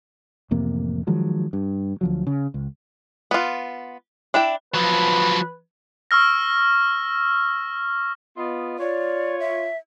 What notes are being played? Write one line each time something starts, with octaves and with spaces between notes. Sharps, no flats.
A1 F2 C3 A#3
D#3 F3 F#3 G#3
G2
D2 F3 F#3
C#3
C#2
B3 F4
D4 E4 E5 G5
F3 F#3 B4
C#6 E6 F6 A#6
B3 F4 D#5
F4 C#5 D5
E5